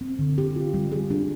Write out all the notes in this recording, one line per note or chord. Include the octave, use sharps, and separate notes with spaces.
C4
D3
G4
F4
G3
G#4
D4